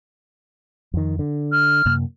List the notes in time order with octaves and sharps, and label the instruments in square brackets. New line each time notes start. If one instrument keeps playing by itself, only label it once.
[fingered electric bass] F2 D#3
D3
[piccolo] F6
[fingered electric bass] F#2 C3 A#3